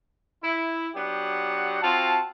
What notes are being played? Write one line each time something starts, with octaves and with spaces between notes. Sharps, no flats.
E4
F#3 B3 D4 G4 F#5
C4 F4 F#4 A5